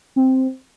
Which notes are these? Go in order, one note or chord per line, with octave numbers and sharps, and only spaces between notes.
C4